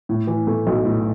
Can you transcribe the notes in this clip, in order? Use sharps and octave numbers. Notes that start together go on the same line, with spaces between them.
A2
E3
A3
B1
A2